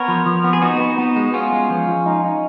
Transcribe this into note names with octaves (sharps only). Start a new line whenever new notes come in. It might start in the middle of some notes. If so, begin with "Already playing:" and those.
Already playing: B3 A#4 C#5
F3
F3
B3
G#4
B3 D#4 F#4
B3
B3
G#3
B3 C#4 F4
G#3
F3
F3
D#4
D#4